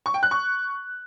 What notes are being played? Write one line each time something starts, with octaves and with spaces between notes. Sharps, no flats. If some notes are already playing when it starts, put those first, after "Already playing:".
C#6
G5
F#6
C#6